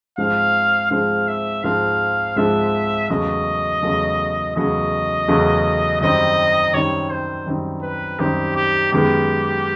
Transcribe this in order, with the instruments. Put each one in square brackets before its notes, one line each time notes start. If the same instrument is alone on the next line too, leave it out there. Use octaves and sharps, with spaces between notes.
[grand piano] G#2 F3 G#3 C4 [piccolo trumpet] F5
[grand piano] G#2 F3 G#3 C4 [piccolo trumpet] F5
[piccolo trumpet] E5
[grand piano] G#2 F3 G#3 C4 [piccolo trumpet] F5
[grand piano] G#2 F3 G#3 C4 [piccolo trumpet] E5
[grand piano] E2 C#3 F#3 A3 C#4 [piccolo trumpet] D#5
[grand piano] E2 C#3 F#3 A3 C#4
[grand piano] E2 C#3 F#3 A3 C#4 [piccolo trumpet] D#5
[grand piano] E2 C#3 F#3 A3 C#4
[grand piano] F#2 D#3 G3 C4 D#4 [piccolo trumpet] D#5
[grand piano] F#2 D#3 G3 C4 D#4 [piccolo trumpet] C#5
[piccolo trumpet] C5
[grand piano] F#2 D#3 G3 C4 D#4
[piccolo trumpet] B4
[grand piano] F#2 D#3 G3 C4 D#4 [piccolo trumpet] G4
[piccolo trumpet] G4
[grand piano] F#2 D#3 G#3 B3 [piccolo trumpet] G4